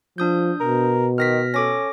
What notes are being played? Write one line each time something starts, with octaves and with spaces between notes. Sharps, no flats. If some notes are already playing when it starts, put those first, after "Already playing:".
F3 D4 D#6 G6
B2 A#4
D#3 F6 A#6 B6
C#4 A4 D6 A#6